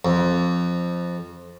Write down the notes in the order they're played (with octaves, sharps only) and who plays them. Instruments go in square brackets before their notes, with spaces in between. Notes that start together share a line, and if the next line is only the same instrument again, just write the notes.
[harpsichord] F2